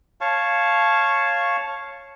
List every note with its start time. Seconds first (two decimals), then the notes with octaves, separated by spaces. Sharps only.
0.21 C#5 F5 A5 C#6